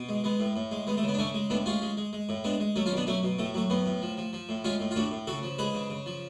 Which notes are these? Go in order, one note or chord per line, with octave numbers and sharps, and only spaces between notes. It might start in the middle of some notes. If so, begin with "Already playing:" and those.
Already playing: B2
G#3
G#3 B3
A2
A2
G#3
G#3 B3
A3
C#3
B3
D4
C#3 A3 C#4
G#3
A2 B3 D4
G#3 C#4 F4
G#3
G#3
G#3
A2
G#3 B3 D4
G#3
F#3 A3 C#4
C#4 F4
B2
B3 D4
F#3 A3 C#4
B2
A2 A3
F#3 A3
A2 B3
A2
F3
F3
F3
A2
G#3 C#4 F4
A2
F4
A2 D4 F#4
A2
C#3 F#4 A4
F3
G#3 G#4 B4
C#3
C#3
F3